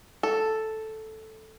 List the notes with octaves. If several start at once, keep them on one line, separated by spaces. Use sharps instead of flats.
A4